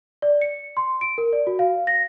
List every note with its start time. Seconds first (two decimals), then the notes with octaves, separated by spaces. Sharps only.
0.22 D5
0.41 C#7
0.77 C6
1.01 D7
1.18 A#4
1.33 D5
1.47 F#4
1.59 F5
1.87 A#6